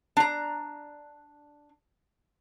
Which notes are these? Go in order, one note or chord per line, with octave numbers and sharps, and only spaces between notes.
D4 A#5